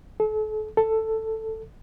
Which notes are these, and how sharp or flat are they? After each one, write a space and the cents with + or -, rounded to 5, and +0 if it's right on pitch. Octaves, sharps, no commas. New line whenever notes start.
A4 -35
A4 +10